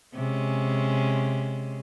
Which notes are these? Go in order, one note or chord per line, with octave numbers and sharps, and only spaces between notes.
C3 G#3 C#4